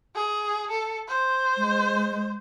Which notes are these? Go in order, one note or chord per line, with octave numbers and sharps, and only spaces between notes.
G#4
A4
C5
G#3